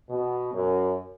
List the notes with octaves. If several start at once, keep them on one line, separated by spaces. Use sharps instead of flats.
B2
F#2